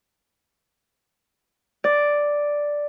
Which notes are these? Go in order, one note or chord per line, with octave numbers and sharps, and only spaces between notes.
D5